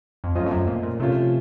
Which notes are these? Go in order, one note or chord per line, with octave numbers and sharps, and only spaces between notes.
F2
F#2 A3 C#4 F4 C5 D#5
F2
F#2
A#2
A#2
C3 F3 A3 C#4 F4